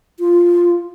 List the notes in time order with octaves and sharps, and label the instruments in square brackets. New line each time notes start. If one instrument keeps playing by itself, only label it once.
[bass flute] F4